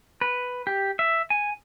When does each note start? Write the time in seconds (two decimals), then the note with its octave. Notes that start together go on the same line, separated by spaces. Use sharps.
0.21 B4
0.67 G4
0.99 E5
1.30 G#5